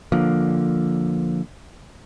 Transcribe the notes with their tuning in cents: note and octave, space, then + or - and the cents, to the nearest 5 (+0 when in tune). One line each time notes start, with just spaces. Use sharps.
D3 +0 F3 +0 A#3 +0